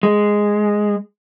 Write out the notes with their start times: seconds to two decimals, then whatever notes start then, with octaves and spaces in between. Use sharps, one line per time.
0.03 G#3